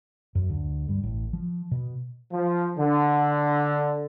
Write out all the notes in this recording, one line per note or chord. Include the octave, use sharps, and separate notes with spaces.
F#2
D2
G2
A1
F3
B2
F3
D3